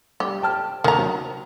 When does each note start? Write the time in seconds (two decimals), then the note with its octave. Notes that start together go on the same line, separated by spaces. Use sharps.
0.20 G3 G4
0.42 G5 A5 F6
0.84 D#2 D#3 A#5
0.98 F#3